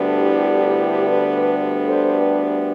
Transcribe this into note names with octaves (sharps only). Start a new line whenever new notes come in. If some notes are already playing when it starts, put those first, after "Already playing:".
Already playing: D2 D3 G3 B3 D4
E4 G4
E4 G4
G4 B4
A4 C5
G4 B4